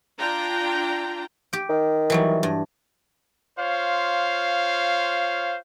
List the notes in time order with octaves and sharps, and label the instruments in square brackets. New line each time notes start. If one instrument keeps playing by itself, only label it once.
[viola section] D4 F4 G5 A#5
[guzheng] G4 G5
[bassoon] D#3
[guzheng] E3 F#3 G3
G2
[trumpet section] F4 C5 C#5 F5